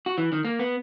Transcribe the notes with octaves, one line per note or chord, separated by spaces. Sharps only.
F#4
E3
D#3
A#3
B3